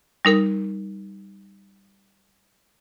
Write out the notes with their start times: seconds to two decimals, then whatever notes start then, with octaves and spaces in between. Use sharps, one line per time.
0.25 G3 D#4 A#4 A#6